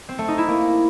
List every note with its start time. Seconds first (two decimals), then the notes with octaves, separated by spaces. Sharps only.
0.09 C4
0.18 A3
0.28 D#4
0.38 E4
0.48 A#3